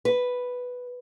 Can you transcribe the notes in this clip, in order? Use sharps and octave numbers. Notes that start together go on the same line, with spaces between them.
B4